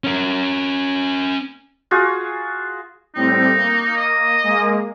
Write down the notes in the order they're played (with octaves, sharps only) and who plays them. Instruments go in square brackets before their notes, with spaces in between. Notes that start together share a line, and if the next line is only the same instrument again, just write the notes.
[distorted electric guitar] C#4 A#4
[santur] F4 F#4 G#4
[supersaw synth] A2 G3 C4 [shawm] D#4
[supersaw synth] A#3
[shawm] D#5
[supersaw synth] G#3 A#3